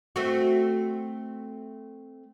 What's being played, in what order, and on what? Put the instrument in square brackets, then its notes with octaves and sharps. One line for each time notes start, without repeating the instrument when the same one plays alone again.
[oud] A3 C4 F#4